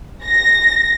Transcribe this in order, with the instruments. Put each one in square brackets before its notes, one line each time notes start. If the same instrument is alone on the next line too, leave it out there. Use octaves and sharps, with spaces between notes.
[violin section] A#6